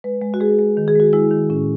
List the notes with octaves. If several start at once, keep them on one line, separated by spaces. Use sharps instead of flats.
G#3 B4
G#3
F#4
G#3 G#4
G#3
D#3
G#4
G#3 F#4
G#3 E4
D#3
A2 C#4